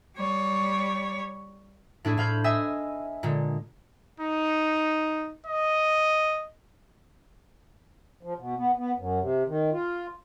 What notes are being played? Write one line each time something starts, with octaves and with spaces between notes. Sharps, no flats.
G3 C#5
A2 D4 E4 G#4
A2 C5 F5 B5 G6 G#6
D#5 E5 G#5 D#6 E6
A#2 D3 G#3
D#4
D#5
F3
B2
B3
B3
F#2
C3
D#3
F4